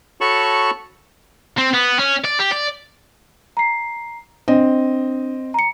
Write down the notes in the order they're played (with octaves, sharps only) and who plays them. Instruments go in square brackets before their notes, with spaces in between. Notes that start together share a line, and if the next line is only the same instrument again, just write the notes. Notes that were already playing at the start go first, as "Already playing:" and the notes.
[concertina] F#4 A4 C#5 A5 B5 C#6
[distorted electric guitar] C4
B3
C#4
D5
G4
D5
[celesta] A#5 C7
[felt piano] C4 D#5 [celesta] D4
[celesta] A#5 C#7